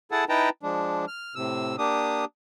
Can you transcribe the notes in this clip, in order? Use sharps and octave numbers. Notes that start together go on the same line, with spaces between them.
E4 G#4 A4 F#5 A5
D#4 E4 B4 G5 A5 A#5
F3 G#3 D4
F6
A2 C3 E6
A#3 D4 G4 D#6